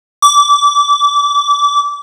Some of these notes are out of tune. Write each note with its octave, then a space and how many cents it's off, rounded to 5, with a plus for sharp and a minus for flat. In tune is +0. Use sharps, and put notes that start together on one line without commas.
D6 -25